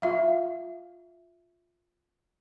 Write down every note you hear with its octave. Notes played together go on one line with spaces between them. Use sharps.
F4 E5 F5